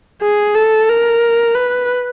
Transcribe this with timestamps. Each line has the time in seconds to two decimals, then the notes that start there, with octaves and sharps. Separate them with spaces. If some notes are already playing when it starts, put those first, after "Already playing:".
0.22 G#4
0.56 A4
0.89 A#4
1.55 B4